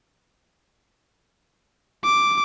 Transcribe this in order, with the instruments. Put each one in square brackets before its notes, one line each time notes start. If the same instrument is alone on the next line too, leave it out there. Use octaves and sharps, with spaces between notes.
[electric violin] D6